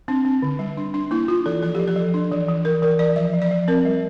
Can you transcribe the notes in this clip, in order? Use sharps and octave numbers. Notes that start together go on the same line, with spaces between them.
C4 D4
C4
D3
G3
D4
D4
A#3 E4
D4 F4
E3 A4
F3 A4
F3 G4
A4
F3
D4
E3
E3
E3 A#4
E3 A#4
E3 D5
F3 E5
F3
D5
F3
C4 A#4
G3